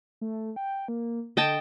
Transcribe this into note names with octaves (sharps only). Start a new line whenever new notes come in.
A3
G5
A#3
D3 D#5 G5 A5